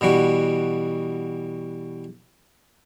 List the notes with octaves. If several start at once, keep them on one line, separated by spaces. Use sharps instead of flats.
B2 E3 G3 F#4